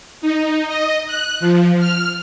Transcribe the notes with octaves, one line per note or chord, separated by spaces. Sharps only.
D#4
D#5
F#6
F3
F6